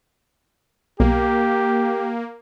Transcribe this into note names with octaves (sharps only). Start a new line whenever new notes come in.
B1 A#3 G4